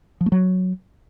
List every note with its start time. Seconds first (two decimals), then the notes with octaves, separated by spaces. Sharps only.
0.21 F3
0.26 A3
0.32 F#3